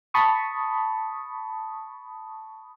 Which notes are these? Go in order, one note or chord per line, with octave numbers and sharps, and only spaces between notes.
A5 B5 C#6 D#6